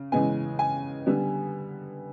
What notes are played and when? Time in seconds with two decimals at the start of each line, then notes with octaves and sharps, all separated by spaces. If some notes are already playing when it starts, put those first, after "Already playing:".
Already playing: C#3
0.12 C#3 E3 G#3 B3 G#5
0.59 G#5
1.06 D3 G3 B3